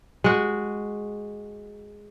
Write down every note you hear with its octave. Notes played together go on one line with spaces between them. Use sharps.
G#3 F#4